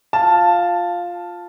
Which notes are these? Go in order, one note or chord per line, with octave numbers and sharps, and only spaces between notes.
F4 F5 A5